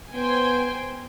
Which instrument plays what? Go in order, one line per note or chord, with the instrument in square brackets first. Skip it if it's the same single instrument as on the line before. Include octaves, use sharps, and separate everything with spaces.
[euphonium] B3 [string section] C5 G5 G#5